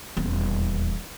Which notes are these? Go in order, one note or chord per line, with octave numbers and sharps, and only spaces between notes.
D#1 E2